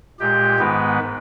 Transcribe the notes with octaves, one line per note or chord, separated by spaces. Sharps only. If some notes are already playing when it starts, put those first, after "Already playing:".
A#2 G#3 G4 G5
G#2 D#3 G#3 B3 B4